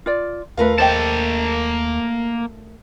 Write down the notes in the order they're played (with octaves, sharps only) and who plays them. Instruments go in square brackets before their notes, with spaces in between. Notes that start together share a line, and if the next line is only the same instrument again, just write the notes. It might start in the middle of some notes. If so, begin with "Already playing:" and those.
[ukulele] F4 D5
[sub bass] D#2 [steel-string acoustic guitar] A3 A#4 F5 [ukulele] F4 B4
[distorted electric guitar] A#3 A5 [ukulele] C5 D#5 G5